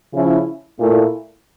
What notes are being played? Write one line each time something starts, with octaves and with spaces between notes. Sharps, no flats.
C#3 F3 C#4 E4
A#2 A3 E4